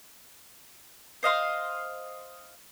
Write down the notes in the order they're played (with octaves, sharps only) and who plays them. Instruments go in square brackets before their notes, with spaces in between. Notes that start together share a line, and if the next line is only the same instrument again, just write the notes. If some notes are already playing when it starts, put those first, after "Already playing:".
[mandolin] C5 D#5 F5 C6